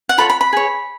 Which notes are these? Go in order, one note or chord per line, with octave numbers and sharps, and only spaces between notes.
F#5
F4 A4 C#5 B5
B5
B5
G#4 C#5